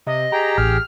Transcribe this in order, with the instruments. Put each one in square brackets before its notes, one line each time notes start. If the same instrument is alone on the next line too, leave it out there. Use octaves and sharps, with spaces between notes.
[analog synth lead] C3 [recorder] D#5
[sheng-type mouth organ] G4 G#4 G5 [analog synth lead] A#5
[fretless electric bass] A1 [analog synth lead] F6